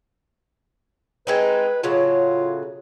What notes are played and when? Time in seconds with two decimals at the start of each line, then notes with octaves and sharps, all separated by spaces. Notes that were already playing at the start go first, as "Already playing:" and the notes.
1.27 G#3 C4 D#4 B4
1.83 A2 C#3 F#3 F4